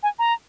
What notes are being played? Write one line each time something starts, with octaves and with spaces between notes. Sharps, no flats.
G#5
A#5